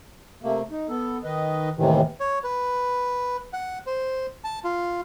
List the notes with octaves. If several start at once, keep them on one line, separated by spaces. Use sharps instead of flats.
C3 A3 A#3
D#4
B3 A4
D#3 B4 D#5
D#2 A2 C3 D#3 E3
C#5
B4
F#5
C5
A5
F4